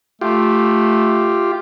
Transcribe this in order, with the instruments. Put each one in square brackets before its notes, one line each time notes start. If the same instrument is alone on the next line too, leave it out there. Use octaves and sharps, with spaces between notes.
[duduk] A3 [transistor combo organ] F4 G4